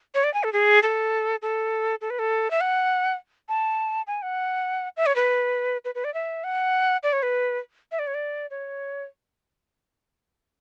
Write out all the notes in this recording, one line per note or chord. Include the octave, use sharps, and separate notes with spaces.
C#5
D5
G#5
A4
G#4
A4
A4
A4
B4
A4
E5
F#5
A5
G#5
F#5
E5
C#5
B4
B4
B4
D5
E5
F#5
D5
C#5
B4
E5
D5
C#5
D5
C#5